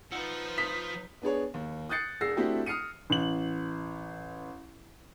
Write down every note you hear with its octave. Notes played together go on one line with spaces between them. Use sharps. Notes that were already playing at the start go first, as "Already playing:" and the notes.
F3 D#4 B4 F#5 E6 C#7
D#6 B6
B3 D4 G#4 C#5
D#2
D#6 F#6 G6 A6 C7 C#7
E1 G#4 E6 A#6 C7
A3 C4 D4 E4 F#4 G4
D#6 F6 C7 C#7 D#7
A1 F#7